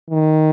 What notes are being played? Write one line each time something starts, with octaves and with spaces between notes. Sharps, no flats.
D#3